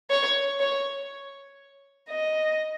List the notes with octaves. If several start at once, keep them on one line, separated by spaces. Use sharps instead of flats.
C#5
C#5
D#5